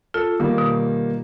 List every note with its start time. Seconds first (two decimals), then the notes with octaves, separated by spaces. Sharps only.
0.14 F4 A4
0.40 D#3 G3 A#3
0.58 B2